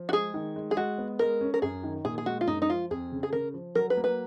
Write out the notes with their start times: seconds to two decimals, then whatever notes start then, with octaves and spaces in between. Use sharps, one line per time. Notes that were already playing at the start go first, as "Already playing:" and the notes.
Already playing: F3
0.09 F#4
0.13 G#3 G#4
0.34 D#3
0.56 G#3
0.71 G#4
0.77 G#3 F#4
0.98 B3
1.19 G#3 A#4
1.41 C#4
1.54 A#4
1.62 F#2 G#4
1.83 D#3
2.05 A#2 G#4
2.18 G#4
2.26 G#3 F#4
2.41 F4
2.47 F#2 D#4
2.62 D#4
2.69 F3 F4
2.91 F2 G#4
3.12 C#3
3.23 G#4
3.32 C#3 A#4
3.54 F3
3.75 F#3 A#4
3.90 B4
3.97 A#3
4.04 B4